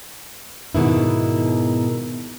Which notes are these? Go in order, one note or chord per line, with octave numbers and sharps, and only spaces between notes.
G#2 B2 D#3 E4